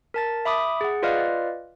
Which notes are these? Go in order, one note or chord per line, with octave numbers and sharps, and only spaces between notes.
A#4 A5 A6
E5 B5 D6 D#6
G#4 F#5
F4 B4 D5 D#5 F5 F6